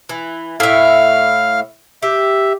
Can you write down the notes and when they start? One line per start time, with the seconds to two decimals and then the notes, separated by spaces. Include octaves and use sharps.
0.09 E3
0.60 A2 E5 F5 F6
2.03 G4 E5